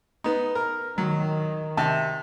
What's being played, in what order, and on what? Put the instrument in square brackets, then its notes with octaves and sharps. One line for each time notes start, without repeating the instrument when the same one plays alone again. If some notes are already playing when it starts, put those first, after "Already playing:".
[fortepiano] B3 D#4
A#4
[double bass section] D#3 [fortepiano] F#3
[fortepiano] C3 E5 A5